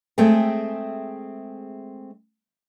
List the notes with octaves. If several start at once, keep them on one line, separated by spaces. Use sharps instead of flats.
G#3 A3 C4 G#4 E5 G5